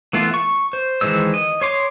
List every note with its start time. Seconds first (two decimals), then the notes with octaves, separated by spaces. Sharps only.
0.13 E3 A3 B3 F4
0.34 C#6
0.73 C5
1.01 D#3 E3 G#3 C5 E6
1.34 D#5
1.62 C#5 C6 D6